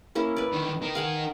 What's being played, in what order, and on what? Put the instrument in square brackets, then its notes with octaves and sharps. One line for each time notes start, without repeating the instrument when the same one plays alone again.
[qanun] A#3 C#4 E4
B4 D5
[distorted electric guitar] D3 D#3
D#4 A#4
[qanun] F5 F#5 G#5